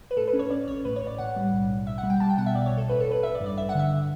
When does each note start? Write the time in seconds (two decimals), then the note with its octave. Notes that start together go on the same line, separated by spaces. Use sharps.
0.11 B4
0.16 A2 A4
0.28 B4
0.33 C#4
0.39 C#5
0.50 C#4 D5
0.68 A1 C#5
0.85 A2 B4
0.96 C#5
1.02 A1 D5
1.18 A2 F#5
1.36 G3
1.53 B1
1.70 B1
1.87 B1 E5
1.98 F#5
2.03 G3
2.10 G5
2.20 G3 A5
2.29 G5
2.38 B2 F#5
2.46 E5
2.55 B1 D5
2.66 C#5
2.71 B1
2.77 A4
2.89 A1 B4
3.00 A4
3.06 A1
3.11 B4
3.23 A1 E5
3.35 D5
3.40 G2
3.46 D5
3.57 A1 E5
3.69 F#5
3.74 D3 E5